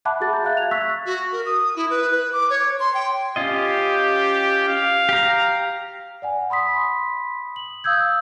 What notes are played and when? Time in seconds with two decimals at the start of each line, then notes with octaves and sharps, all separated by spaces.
0.05 E5 F#5 A5 B5 D6 F#6
0.20 F#4 G#4 A6
0.33 A#5 G6
0.44 E5 F5 F#6
0.57 G#6 F7
0.71 C#6 E6 F#6 A6 B6
1.06 F#4
1.32 A#4
1.46 D#6
1.76 E4
1.90 B4
2.11 B4
2.33 D6
2.50 C#5
2.80 C6
2.94 G5
3.36 C#4 F4 G4 D#5
4.68 F5
5.09 G4 A#5
6.22 D5 F#5 G#5
6.50 B5 C6 D#6 B6
7.56 F#7
7.84 F5 D#6 E6 G6 G#6